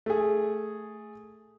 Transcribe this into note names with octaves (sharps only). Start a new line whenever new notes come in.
A3 G#4